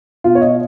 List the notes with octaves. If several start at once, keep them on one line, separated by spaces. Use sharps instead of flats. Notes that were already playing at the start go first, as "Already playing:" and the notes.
B2 F4
C#5
D#5